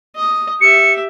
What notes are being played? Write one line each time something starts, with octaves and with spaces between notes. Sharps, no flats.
D#5
G4 E5 C#7